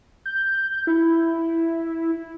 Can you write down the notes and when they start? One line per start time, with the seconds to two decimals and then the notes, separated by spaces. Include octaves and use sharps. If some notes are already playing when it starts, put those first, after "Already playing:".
0.26 G6
0.87 E4